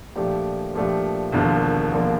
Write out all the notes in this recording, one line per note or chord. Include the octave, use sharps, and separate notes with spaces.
A#2 F3 A3 D4 G4
A#2 F3 A3 D4 G4
E1 D#2 D3 F3 A#3
E1 D#2 D3 F3 A#3